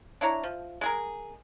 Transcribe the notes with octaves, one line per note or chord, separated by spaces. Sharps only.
D4 E4 C#5 A#5
F3
G#3 G#4 A#4